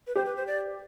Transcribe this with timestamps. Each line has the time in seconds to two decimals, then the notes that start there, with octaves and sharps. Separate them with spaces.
0.07 B4
0.16 G4 C5
0.25 B4
0.36 C5
0.47 D5